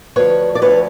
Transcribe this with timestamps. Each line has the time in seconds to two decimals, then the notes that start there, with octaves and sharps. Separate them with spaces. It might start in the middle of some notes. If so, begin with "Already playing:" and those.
0.16 D2 D3 F3 B4 C#5
0.55 D5
0.62 D2 D3 F3 B4 C#5